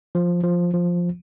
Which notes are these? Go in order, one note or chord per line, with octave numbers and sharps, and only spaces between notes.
F3
F3
F3